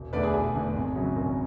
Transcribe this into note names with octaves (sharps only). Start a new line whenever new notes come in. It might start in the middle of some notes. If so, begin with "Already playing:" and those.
Already playing: E1
E2 D3 A3 D4 B4 D5
G#4
E1 G#4
E2 D3 A3 D4
G#1
F#2 C#3 F#3
G#1